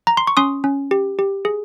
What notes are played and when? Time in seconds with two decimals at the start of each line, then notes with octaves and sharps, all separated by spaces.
0.07 A#5
0.17 C6
0.27 C#6
0.37 C#4 C6 D#6
0.64 C#4
0.91 G4
1.19 G4
1.45 G#4